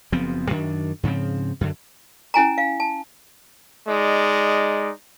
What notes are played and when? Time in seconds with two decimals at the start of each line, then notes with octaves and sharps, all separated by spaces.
0.12 F#1 F3 B3 C4
0.50 F#2 D#3 D4
1.03 G#2 C#3 F3 C4
1.61 F#2 D3
2.34 C#4 E4 G#5 A#5
2.58 F5
2.80 A5
3.89 G#3 D#4 D5